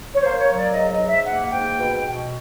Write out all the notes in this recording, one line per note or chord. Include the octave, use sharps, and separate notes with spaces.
C#5
A#3 C5
C#5
F#3
D5
G#2 D#5
D#5
G#2
E5
A#3 F#5
G#2 G5
B2
B2